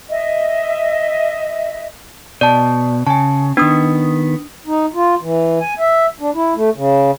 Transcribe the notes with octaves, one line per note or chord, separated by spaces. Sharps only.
D#5 E5
B2 D5 A5
C#3 G#5 A5
D#3 B3 D4 D#6
D#4
F4
E3
G#5
E5
D4
E4
A3
C#3